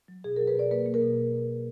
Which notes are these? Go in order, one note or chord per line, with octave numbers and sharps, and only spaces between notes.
F#3
B2 G#4
F#3 A#4
B4
B2 D5
A#3 B4
A#3
A#4
B2